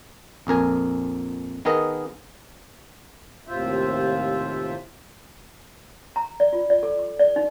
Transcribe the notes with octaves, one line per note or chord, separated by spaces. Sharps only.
A#1 F2 A#4 G#5
D#3 B3 G#4 A#4 D#5
D#2 A2 C3 F4 C5 E5
A#5
D5
F4
D5
A4
D6
D5
D#4